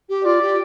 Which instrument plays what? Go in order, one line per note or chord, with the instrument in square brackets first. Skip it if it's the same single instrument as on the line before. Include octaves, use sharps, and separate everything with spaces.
[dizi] G4
[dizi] F4 [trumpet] D5
[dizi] G4